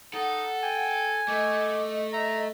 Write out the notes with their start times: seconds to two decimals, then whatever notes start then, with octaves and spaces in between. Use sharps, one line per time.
0.14 D#4 A4 F#5
0.63 G5 G#5
1.28 A3 D#5 D6
2.13 E5 A#5